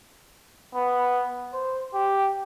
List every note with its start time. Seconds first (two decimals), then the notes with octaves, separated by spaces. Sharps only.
0.75 B3
1.53 C5
1.94 G4